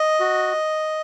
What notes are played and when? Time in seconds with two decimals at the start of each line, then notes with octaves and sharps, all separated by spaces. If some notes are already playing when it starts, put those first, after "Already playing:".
Already playing: D#5
0.20 F#4